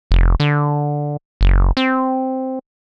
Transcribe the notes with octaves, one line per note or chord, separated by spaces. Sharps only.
F1
D3
F#1
C4